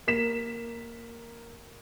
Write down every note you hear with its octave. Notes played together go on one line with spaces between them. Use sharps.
A#3 B6 E7